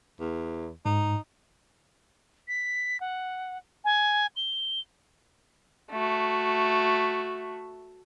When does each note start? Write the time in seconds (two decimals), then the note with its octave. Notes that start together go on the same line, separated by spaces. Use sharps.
0.20 E2
0.86 G#2 D#4
2.48 B6
3.00 F#5
3.85 G#5
4.36 G7
5.91 A3 F#4